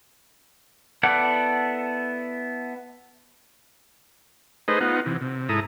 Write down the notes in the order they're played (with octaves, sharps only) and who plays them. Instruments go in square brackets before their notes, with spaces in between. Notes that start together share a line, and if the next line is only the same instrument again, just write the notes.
[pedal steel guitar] B3 E4 A4 D5 F#5
[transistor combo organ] A3 D#4 G#4 B4 C5 D#5
B3 D#4 F4 F#5
C3 E3
C3
G#2 E4 A4 A#5 D#6